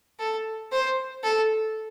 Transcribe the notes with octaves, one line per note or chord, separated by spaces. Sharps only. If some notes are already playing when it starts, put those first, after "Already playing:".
A4
C5
A4